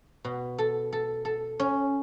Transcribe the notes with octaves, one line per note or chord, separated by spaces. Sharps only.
B2
A4
A4
A4
C#4